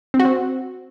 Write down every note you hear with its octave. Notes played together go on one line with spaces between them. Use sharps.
C4
F#4
C4